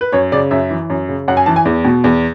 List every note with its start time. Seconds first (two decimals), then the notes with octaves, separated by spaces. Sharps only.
0.01 B4
0.12 F#2 C#5
0.32 C#3 D5
0.51 F#2 E5
0.70 E3
0.90 F#2
1.09 C#3
1.28 F#2 F#5
1.37 G#5
1.46 E3 A5
1.56 G#5
1.65 E2
1.85 B2
2.04 E2